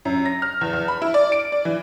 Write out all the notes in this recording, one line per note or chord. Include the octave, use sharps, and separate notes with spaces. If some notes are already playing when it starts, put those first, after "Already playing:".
F#2
A#6
F6
E2
E2
B5
E4
D5
D7
D5
E3